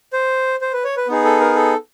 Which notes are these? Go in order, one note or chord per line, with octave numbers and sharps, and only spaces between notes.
C5
C5
B4
C#5
B4
B3 D#4 G#4
A4
A#4
A4